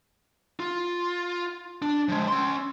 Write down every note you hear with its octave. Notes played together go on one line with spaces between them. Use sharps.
F4
D4
F3 G#3
C#4 C6